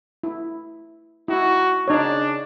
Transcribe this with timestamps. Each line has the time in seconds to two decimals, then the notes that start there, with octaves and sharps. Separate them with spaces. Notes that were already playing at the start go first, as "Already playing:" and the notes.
0.23 E4
1.28 D#4 E4 F#4
1.88 C#3 D4 D#4 C#5